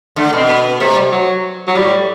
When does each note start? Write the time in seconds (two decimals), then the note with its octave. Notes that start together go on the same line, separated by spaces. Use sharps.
0.16 D3 A3
0.33 B2 C4
0.48 B3
0.80 C3 A3
0.95 G3
1.11 F#3
1.67 F#3
1.75 A2 G3